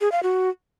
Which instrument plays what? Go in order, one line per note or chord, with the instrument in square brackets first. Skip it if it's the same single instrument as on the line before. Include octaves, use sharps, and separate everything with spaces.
[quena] G#4
F5
F#4